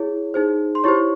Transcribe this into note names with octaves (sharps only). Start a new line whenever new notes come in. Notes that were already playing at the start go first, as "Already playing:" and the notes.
Already playing: E4 G#4 C#5
D#4 G#4 C5
C6
E4 G4 C5 C#5 C#6